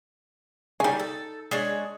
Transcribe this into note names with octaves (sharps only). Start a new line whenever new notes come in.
C#3 G3 D#4 G#5
A4
G#3 D4 C#5